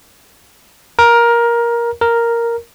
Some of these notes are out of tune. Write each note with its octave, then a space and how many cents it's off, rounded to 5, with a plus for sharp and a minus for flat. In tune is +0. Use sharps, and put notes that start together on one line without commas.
A#4 +15
A#4 +0